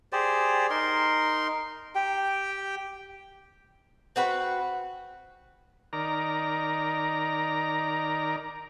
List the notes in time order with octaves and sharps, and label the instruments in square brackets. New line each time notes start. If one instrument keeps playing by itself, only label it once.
[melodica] G4 G#4 C5 D5
D#4 A#4 C6
G4 G5
[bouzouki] C4 F#4 B4
[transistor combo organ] D#3 A#4 D5 A#5